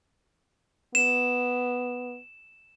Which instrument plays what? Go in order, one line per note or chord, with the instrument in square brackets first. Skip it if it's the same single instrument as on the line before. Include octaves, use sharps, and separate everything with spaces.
[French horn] B3 [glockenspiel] E7